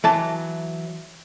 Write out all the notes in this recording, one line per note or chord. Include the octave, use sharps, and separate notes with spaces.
E3 F#3 A5